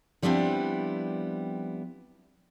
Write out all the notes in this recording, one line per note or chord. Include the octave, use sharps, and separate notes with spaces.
F3 G3 B3 C4 D4 E4